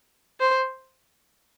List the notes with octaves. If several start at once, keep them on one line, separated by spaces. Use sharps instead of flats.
C5